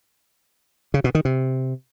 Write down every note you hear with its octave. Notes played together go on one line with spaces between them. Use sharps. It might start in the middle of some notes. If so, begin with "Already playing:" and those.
C#3
B2
D#3
C3